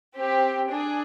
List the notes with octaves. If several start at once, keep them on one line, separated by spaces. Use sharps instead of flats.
C4 G4
D4 G#4